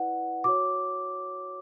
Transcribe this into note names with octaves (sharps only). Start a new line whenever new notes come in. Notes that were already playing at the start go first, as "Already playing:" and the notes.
Already playing: E4 B4 D5 F#5
F#4 C#5 D6